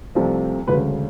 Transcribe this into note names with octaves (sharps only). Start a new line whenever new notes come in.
C2 C3 F3 A3
E1 D2 C#3 B4